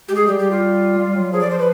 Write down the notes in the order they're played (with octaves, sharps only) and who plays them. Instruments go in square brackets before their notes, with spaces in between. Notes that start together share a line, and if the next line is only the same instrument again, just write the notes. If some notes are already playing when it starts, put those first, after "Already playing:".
[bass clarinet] G#3 [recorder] G4
[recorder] G#4
[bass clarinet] G3 [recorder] G4
[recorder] G4
F4
[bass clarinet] G3
F#3
[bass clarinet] F3 [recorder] G#4
[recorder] D5
C5
B4